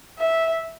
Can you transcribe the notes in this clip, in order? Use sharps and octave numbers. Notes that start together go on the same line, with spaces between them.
E5